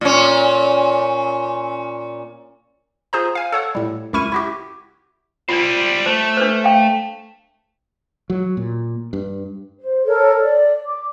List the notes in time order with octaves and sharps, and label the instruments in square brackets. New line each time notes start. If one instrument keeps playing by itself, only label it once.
[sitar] A#2 C#4
[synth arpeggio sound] F4 G#4 C5 A#5
F5 G#5
A4 C#5 F#5
A2 G3
C#2 F#2 E4 C#6 F6 D#7
E4 F#4 G4
[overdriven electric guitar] G3 C5 [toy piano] F4 D5
[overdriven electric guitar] A3 [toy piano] C5
[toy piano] D4 B4 C5
F5 G5
[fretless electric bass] F#3
A#2
G2
[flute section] C5
A4 A#4 C#5
D5
D6